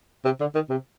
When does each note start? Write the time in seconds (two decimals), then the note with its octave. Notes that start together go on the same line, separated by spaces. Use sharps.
0.25 C3
0.40 D3
0.54 D#3
0.69 C3